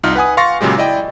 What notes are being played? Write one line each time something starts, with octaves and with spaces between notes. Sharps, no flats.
C2 D#4 F4 F6
B4 F#5 G#5 D#6
F5 C6 C#6 A6 A#6
A#2 C#3 F#3 G#3 G4
E4 D5 D#5 G5